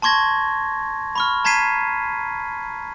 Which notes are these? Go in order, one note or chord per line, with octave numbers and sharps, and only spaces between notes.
A5 C6 C#6 G#6 A#6
B5 C#6 F6
A5 A#5 G#6 B6 C7 D#7